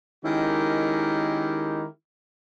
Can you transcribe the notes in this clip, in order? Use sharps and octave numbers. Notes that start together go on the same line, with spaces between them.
D#3 G#3 C#4 E4 G4 A#4